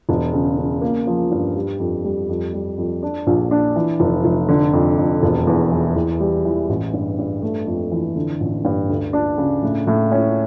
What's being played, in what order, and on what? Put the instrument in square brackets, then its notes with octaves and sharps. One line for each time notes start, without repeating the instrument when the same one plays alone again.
[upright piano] E1
C#3
C#3
A#3
F3
G2
G3
F2
G3
F2
G3
F2
D4
A#1
D4
E3
F1
F1
D3
F2
F2
E1
E2
E3
E2
G3
E3
A1
G2
G2
A3
F2
E3
D3
A1
G2
D2
D4
C#3
A2
A2
C#4